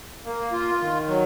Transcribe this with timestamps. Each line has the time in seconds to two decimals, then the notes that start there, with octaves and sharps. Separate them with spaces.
0.25 A#3
0.52 F4
0.81 D#3
1.08 F#3